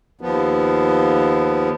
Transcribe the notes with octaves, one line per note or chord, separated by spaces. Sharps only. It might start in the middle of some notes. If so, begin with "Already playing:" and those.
D#2 F3 B3